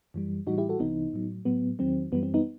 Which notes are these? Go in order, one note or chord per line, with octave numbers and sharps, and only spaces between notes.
F#2 E3 G3
A2 E3 G3 D#4 F#4
E4 G4
F#4 A4
C2 C3 E3 B3 D#4
A2 F#3
A2 F#3 B3
E2 D#3 F#3 C4
F#2 E3 G3 B3
C4
B3 D#4